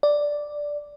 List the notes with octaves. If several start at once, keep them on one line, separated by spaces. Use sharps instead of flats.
D5